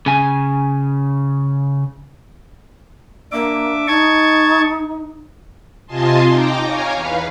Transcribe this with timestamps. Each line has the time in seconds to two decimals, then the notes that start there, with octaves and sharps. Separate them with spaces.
0.06 C#3 G#5
3.32 A#3 D4 E5 D6
3.88 D#4 A5 C#6 G#6
5.87 C3 F4 D#5 G#5 A5 C6
6.30 D#4 G5 A#5 D6
6.64 C#5 F5 G#5 A#5
6.95 E2 B4 F5